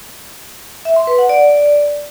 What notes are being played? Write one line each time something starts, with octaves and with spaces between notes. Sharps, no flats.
E5
C6
B4
F#5
D5